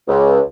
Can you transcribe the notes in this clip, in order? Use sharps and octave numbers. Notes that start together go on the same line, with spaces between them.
C#2